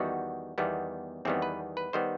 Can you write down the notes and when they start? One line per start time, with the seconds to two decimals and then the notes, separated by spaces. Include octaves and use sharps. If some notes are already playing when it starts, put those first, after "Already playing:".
Already playing: E2 D#3 G3 B3 F#4
0.58 E2 D#3 G3 B3
1.25 E2 D#3 G3 B3 C4
1.42 B4
1.77 B4
1.93 D#3 G3 B3 C5